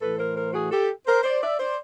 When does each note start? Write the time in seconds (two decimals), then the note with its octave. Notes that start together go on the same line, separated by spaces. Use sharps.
0.01 A2 E3 A4 B4
0.18 A#4 C5
0.35 A#4 C5
0.53 F#4 G#4
0.71 G4 A4
1.07 A#4 C5
1.24 C5 D5
1.42 D5 E5
1.59 C5 D5